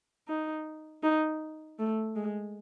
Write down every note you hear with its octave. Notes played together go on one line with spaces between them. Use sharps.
D#4
D#4
A3
G#3